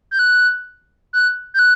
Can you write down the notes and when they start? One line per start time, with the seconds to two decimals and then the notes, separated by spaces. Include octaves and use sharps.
0.11 G6
0.19 F#6
1.13 F#6
1.54 G6
1.59 F#6